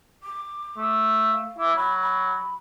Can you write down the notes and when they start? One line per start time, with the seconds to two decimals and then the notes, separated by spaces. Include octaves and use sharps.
0.23 D6
0.77 A3
1.32 F5
1.59 E4 D6
1.76 F#3 B5
2.01 B5